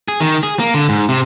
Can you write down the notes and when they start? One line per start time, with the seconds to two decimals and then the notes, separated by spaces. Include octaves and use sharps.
0.08 G#4
0.20 D#3
0.43 G#4
0.59 A#3
0.74 D3
0.89 G#2
1.09 C3